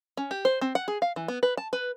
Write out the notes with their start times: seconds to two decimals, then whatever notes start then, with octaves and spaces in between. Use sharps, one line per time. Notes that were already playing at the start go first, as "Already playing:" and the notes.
0.17 C#4
0.31 G4
0.45 C5
0.61 C4
0.75 F#5
0.88 G#4
1.02 F5
1.16 E3
1.28 B3
1.43 B4
1.57 A5
1.73 B4